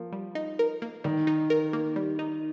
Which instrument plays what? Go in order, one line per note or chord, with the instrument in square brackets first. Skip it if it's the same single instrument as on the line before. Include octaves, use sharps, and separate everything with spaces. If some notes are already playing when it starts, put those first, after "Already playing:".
Already playing: [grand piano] F3 [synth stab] A#3
[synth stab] G3
D#4
A#4
A#3
[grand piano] D#3 [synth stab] G3
[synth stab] D#4
A#4
A#3
G3
D#4